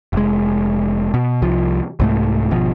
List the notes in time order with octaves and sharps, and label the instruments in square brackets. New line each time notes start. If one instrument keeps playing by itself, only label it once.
[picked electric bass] F1 G#3
B2
C2 F3
C2 G#2 A3
G#1 B2 F3